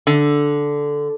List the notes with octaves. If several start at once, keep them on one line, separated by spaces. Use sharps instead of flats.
D3